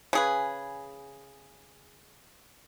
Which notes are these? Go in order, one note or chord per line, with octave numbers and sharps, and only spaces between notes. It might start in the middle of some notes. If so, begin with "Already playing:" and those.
C#3 G#4 B4